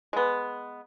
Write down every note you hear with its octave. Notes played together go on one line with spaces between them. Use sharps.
G#3 B3